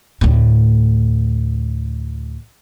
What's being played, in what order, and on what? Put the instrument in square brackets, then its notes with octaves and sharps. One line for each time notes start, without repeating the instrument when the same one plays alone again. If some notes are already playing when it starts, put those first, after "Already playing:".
[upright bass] D2 A2